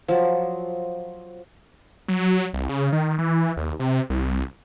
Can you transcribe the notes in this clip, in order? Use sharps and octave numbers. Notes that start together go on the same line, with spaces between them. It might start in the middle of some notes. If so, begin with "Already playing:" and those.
F3 F#3
F#3
C2
C#3
D#3
E3
D#2
C3
C2